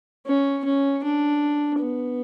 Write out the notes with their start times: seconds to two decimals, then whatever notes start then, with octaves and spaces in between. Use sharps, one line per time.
0.27 C#4
0.65 C#4
1.04 D4
1.80 B3